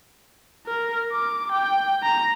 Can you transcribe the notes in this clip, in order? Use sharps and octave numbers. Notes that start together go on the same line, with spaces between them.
A#4
D6
G5
A#5